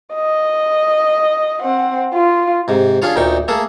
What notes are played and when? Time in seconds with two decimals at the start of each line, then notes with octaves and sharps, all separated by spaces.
0.14 D#5
1.62 C4 F#5
2.14 F4
2.68 G#2 C3
3.02 C#4 D4 F4 G#4 C#5
3.16 D2 A#2 D#4 G5 C#6
3.48 A3 A#3 G#4 A4